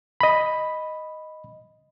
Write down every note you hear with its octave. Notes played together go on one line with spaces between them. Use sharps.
D#5 B5